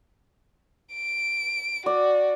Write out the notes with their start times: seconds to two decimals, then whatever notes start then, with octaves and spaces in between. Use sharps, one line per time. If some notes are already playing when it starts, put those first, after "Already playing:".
0.95 D7
1.86 F#4 D5